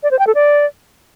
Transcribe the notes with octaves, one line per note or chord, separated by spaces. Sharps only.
D5
C5
G5
A4
D5